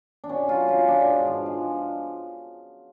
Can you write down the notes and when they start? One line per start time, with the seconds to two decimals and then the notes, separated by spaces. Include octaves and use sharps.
0.24 D4
0.29 B2 C#4
0.49 F#3 F4
0.68 C#4 F4
0.88 B2 D4
1.07 G#2
1.27 F3
1.46 G#3